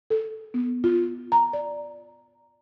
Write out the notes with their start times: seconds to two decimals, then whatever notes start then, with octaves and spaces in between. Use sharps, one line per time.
0.10 A4
0.54 B3
0.84 F4
1.32 A#5
1.53 D5